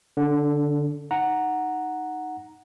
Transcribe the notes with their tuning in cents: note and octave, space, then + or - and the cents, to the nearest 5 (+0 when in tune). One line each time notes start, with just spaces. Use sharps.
D3 +0 D4 -45
D#4 +0 F#5 +0 A#5 +0